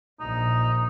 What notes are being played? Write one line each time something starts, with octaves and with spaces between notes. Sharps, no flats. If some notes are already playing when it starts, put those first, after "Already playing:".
A#1 D#4